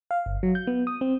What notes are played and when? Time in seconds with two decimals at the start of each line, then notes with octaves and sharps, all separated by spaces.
0.11 F5
0.26 G1
0.43 F#3
0.55 G6
0.67 B3
0.87 D#6
1.01 C4